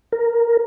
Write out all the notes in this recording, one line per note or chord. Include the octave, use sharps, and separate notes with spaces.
A#4